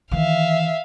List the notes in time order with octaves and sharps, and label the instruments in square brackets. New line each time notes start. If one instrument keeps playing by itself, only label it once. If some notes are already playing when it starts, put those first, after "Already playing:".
[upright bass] D#3 E3 [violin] E5 F5